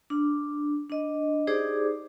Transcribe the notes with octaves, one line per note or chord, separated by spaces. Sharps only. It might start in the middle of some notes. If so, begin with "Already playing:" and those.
D4
D4 D#5
D#4 G4 G#4 C5 D5 D6